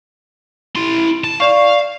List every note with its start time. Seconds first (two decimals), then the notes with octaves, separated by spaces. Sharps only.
0.75 E4 C6
1.24 A5
1.40 D5 F5 C#6